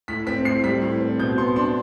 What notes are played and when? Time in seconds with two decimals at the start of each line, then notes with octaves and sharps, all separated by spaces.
0.08 A2 B6
0.27 C4 B6
0.45 A2 C7
0.64 G3 B6
0.82 A2
1.00 C4
1.19 B2 G6
1.38 B3 C6
1.56 D4 C6